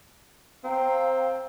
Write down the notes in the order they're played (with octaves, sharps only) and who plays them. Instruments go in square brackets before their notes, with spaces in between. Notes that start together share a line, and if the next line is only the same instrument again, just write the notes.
[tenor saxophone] C4 [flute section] F5 G5 A#5